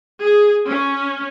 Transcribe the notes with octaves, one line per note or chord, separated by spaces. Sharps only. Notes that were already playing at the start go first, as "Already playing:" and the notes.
G#4
C#4